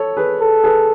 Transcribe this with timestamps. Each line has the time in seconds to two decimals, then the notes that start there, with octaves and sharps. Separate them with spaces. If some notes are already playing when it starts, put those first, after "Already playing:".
Already playing: A4 C#5
0.17 G#4 B4
0.40 A4
0.64 G#4 B4